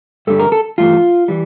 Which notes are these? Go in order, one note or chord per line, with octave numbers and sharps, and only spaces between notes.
G2 D3 G3 A4
A#4
A4
G2 E3 A3 F4
E3 G3